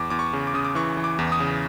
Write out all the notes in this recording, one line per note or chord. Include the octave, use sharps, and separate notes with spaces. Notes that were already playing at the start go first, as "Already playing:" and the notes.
Already playing: E2 D6
E2 D6
C#6
C#3
D6
C#3 D#6
D6
E3 C#6
E3
D6
E2
D#6
C#3